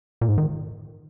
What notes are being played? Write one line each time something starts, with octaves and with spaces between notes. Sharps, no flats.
A#2
G#2
D#3